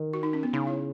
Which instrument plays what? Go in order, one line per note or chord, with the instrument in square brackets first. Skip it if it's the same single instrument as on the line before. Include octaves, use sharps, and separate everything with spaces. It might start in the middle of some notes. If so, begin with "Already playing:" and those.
Already playing: [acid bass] D#3
[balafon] F#4
D#4
C#4
B3
[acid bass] C#3 [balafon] D#4
[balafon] E4